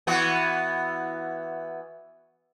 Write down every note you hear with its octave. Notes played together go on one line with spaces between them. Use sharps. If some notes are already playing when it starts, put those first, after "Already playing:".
E3 B3 F#4